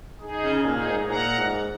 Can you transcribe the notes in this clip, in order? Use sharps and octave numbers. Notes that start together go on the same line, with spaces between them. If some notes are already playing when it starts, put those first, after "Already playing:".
D#4 G#4
C#3
A#2 D#4 G#4
G#2
A#2 F#5 A#5
G#2